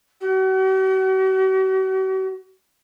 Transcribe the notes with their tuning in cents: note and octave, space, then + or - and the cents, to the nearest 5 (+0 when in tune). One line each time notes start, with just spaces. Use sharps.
F#4 +45